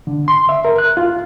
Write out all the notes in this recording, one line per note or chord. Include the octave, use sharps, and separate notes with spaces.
D3
C6
E5
A#4
F#6
F4